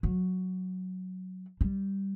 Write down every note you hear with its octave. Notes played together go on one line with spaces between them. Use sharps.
F#3
G3